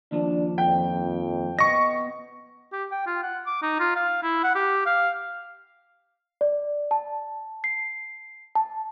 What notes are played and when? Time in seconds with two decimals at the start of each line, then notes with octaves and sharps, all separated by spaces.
0.12 D#2 F3 D4
0.58 F2 G5
1.59 B3 D#5 C#6 A#6
2.73 G4
2.92 G5
3.06 F4
3.23 F#5
3.47 D6
3.62 D#4
3.80 F4
3.96 F5
4.23 E4
4.44 F#5
4.55 G4
4.86 F5
6.41 D5
6.91 A5
7.64 C7
8.55 A5